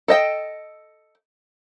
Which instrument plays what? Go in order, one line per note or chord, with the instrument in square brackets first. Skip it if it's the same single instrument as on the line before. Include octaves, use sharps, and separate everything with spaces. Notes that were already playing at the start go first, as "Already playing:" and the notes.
[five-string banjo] A4 D#5 G5